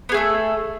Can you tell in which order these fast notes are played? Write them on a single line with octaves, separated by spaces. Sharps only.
B3 G#4 A3 A4